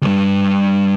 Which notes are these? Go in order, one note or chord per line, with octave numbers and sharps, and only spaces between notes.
D2 G2